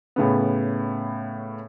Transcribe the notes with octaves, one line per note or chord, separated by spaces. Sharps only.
A2 C#3 B3